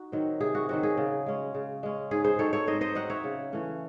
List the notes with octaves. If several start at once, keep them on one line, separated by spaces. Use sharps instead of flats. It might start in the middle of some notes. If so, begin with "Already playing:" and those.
Already playing: D#4 F#4
D#3 F#3 C4
C3 G#4
F#4
D#3 F#3 C4 F#4
G#4
C#3
G#3 C#4
C#3
G#3 C#4
G#2 G#4
G#4 C5
F#3 C4 D#4 A4 C#5
A4 C#5
G#2 C5 D#5
C5 D#5
F#3 C4 D#4 D#5 F#5
C#5 E5
C#3
E3 A3 C#4